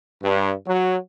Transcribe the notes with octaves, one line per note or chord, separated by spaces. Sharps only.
G2
F#3